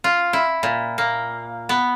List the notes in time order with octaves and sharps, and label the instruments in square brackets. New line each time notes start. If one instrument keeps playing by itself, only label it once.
[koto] F4
E4
A#2
A#3
B3